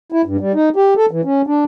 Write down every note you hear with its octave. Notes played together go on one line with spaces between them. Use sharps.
E4
G2
G3
D#4
G4
A4
E3
C#4
D4